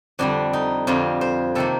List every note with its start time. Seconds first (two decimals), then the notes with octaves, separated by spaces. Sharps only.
0.19 F2 D3 G3 D4
0.53 D#4
0.87 F2 D3 G3 F4
1.21 C5
1.55 C3 D#3 A#3 A4